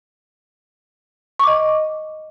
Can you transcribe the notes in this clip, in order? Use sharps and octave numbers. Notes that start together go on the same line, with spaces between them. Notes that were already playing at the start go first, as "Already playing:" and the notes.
D#5 C#6 D6